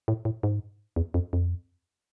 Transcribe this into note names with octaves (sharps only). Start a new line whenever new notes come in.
A2
A2
G#2
E2
F2
F2